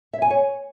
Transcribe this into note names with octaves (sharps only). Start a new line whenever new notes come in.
E5
G#5
C#5